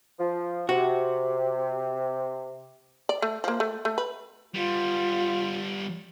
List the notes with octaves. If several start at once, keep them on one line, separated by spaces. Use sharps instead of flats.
F3
C3 F#4
D5
A3
F3 A#3
A3
A3
B4
G3 B3 F4